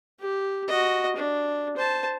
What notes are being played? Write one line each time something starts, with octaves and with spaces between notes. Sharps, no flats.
G4
F#4 D#5
D4
C5 A5